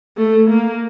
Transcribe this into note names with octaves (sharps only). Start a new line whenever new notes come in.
A3
A#3